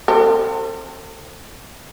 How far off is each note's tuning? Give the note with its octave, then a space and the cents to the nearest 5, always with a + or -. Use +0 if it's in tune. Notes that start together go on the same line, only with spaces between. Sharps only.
C4 +20 A4 +40